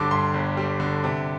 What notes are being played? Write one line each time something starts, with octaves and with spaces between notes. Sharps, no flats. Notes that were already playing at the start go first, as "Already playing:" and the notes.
Already playing: G1 G2 D3 G3 D6
G2 C6
G1
G3
D3
C3